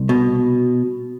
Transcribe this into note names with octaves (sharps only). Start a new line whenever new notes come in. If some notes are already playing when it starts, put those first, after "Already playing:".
Already playing: C2
B2